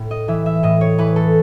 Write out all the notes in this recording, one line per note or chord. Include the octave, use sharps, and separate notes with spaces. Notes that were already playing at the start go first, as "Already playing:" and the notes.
Already playing: A2
D#5
E3 E5
E5
A2 D#5
C#5
E3 B4
A4